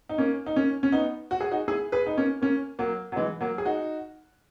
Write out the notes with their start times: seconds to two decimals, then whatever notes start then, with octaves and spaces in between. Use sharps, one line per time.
0.09 D#4
0.18 A#3 C#4
0.47 D#4
0.56 A#3 C#4
0.83 C#4
0.92 B3 D#4
1.31 F#4
1.40 G#4
1.51 D#4 F#4
1.68 E4 G#4
1.92 G#4 B4
2.07 D#4
2.18 A#3 C#4
2.42 A#3 C#4
2.79 F#3 A#3
3.12 F#3
3.16 E3 G#3
3.41 F#3 A#3
3.58 G#4
3.65 D#4 F#4